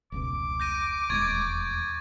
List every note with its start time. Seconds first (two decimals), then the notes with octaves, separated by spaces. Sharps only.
0.12 F1 C#2 B2 D6
0.60 G6 A#6 D#7
1.10 D#1 E2 G#3 C#6 G#6 A6